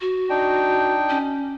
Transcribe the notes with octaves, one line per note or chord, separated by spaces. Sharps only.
F#4
D4 D#4 G5
C#4